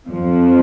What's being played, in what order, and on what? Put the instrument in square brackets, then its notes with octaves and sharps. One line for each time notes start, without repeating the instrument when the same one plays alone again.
[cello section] F2 F3